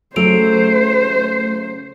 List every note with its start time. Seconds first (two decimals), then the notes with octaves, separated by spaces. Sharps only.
0.16 C#3 F#3 A3 A4 C5 D7 F7